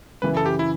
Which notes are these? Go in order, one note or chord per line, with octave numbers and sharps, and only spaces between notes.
F#2 C#3 E3 B4
A4
G4
E4